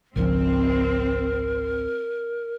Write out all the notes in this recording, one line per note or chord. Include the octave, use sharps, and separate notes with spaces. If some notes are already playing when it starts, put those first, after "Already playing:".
G#1 C#2 F3 C4 A#4